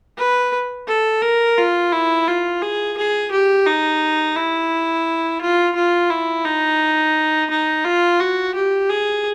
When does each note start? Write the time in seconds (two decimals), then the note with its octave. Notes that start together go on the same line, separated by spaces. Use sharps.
0.18 B4
0.88 A4
1.22 A#4
1.58 F4
1.92 E4
2.28 F4
2.62 G#4
2.97 G#4
3.31 G4
3.66 D#4
4.36 E4
5.41 F4
5.75 F4
6.10 E4
6.45 D#4
7.50 D#4
7.84 F4
8.20 F#4
8.55 G4
8.90 G#4